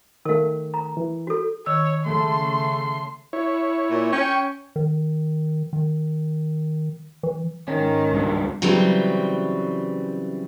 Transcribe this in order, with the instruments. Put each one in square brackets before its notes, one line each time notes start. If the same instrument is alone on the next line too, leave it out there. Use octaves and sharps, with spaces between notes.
[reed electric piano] D#3 A3 [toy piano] A#4 F5
[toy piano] A#5
[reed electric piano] E3
[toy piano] F#4 A4
[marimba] D#3 E6 [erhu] C#5
[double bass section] C#3 A3 [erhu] C6
[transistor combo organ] E4 C#5
[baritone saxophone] A#2
[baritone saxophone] C#4 [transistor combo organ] G5 C#6
[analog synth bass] D#3
D#3
E3
[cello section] G#2 D#3 [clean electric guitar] C#4
[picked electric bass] C#2 G2
[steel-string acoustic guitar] C#3 E3 F#3 G3 C4